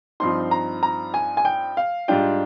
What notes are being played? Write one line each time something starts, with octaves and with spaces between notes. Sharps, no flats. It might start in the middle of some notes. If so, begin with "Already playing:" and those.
G2 F3 C4 D#4 C6
A#5
A#5
G#5
G#5
G5
F5
G#2 G3 D4 F4 G5